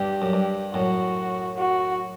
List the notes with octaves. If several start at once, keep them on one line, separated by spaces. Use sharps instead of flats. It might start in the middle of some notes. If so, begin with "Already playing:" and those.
Already playing: G2 G4
F#2
G2
F#2 A2 F#4
F#4